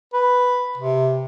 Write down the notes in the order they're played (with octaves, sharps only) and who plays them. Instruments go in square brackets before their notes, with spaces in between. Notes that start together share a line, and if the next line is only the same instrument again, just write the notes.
[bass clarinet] B4
C3